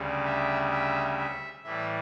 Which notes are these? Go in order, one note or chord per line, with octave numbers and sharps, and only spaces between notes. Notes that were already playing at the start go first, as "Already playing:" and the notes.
Already playing: D2 C#3 G3
E5
E5
E5
A2 E3 G3 E5